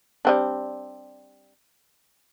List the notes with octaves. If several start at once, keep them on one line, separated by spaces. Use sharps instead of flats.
G3 C4 D4